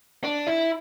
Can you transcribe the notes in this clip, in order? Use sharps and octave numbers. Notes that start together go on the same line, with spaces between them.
D4
E4